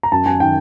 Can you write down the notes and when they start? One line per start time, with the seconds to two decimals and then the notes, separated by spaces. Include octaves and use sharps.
0.03 A#5
0.12 F#2 A5
0.26 F#2 G#5
0.40 D#3 G5